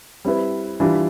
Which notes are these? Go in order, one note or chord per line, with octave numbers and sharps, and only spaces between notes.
G3 C4 E4 B4
E3 G3 D4 F4